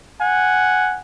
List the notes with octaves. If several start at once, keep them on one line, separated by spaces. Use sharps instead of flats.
F#5 G#5